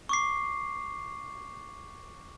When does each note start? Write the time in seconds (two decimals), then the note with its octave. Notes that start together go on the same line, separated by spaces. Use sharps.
0.09 C#6 D6 C7